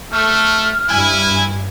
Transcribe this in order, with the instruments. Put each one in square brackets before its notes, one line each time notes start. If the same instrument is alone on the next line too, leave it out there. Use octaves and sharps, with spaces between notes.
[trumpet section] A3 [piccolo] F6
[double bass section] G2 [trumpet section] E4 G#5